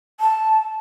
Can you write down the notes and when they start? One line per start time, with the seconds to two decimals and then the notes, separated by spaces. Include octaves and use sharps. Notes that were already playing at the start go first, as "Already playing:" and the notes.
0.20 A5